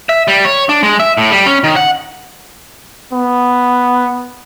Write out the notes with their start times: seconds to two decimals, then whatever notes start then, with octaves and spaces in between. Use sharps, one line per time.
0.09 E5
0.28 G3
0.45 C#5
0.69 D4
0.83 G#3
1.00 E5
1.18 A2
1.31 G3
1.46 C#4
1.64 D#3
1.76 F#5
3.13 B3